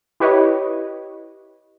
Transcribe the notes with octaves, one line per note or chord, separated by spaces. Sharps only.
E4 G4 B4 C#5 D#5